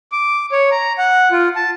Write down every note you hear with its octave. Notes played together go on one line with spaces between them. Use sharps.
D6
C#5
A#5
F#5
F4
A5